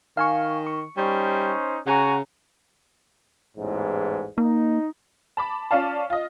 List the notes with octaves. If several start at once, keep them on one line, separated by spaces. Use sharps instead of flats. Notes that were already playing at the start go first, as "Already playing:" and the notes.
D#3 F5 G#5 C#6
C#6
G3 C#4 D#4 C5
C#3 F#4 G#5 A#5
A1 E2 G#2
A#3 D#4
A5 B5 D6
C#4 F4 D5 F5 A5
F4 D#5